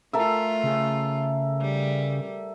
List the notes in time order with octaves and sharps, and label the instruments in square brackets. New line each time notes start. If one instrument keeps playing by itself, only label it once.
[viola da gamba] A3 F4 [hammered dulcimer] A4 A#4 E5
[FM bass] C#3
[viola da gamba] G3